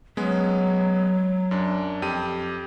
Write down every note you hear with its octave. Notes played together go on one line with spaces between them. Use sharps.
F#3 G#3 B3 C#4
F#2 D4
F2 G4 D#7